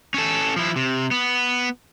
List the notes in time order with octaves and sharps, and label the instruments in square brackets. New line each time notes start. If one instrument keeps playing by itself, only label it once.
[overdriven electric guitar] C#4 A4
F3 E4
C3
B3